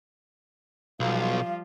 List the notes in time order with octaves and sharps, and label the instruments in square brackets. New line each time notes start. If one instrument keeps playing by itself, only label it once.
[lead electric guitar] B1 [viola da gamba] F3 G3 F4 [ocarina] F5